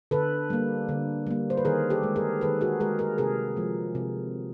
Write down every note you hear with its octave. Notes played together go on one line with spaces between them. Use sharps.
D3 A4 B4
G3 A#3
D3
G3 A#3
C5
B4
D#3 G#4 A#4
G4 A4
G#3
G#4 A#4
D#3 A4 B4
F#4 G#4
G#3 G#4 A#4
G#4 A#4
C3 G#4 A#4
F3 G#3
C3